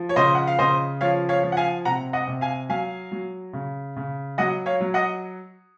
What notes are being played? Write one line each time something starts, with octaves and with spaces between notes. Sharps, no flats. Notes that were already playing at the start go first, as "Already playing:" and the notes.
Already playing: F3
C#5
C#3 C5 D#5
F#5
F5
C#3 C5 D#5
F3 C#5 F5
C#5 F5
F3
F#5
F5 G#5
C3 F#5 A#5
D#5 F#5
C3
F5 G#5
F#3 F5 G#5
F#3
C#3
C#3
F#3 D#5 F#5
C#5 F5
F#3
D#5 F#5